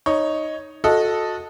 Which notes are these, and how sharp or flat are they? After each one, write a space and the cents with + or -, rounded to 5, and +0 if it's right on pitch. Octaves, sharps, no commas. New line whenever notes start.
D#4 +0 C#5 +0
F#4 -20 A4 +0 D#5 +0